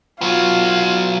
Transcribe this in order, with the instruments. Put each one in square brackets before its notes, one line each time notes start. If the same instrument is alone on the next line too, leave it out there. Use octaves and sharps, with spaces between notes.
[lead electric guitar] F#3 B3 [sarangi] F4